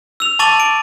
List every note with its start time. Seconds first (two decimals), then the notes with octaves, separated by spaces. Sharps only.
0.20 E6 F7
0.39 A5 C#6 D6 A6 D#7 F#7
0.60 D7